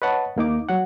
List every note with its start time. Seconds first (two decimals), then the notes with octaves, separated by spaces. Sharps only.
0.02 B4 C#5 D#5 F#5 A5
0.36 D#2 A#3 D#4 D6
0.69 F#3 F#5